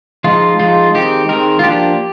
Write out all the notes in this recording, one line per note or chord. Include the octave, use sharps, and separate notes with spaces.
F3 G#3 D#4 F4
F3 G#3 D#4 F4
D#3 G#3 C4 D#4 G4
D#3 G#3 C4 D#4 A#4
F4
F3 A#3 D4 G4